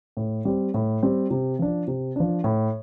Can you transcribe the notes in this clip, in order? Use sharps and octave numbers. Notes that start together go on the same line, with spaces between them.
A2
G3 C4
A2
G3 C4
C3
F3 D4
C3
F3 D4
A2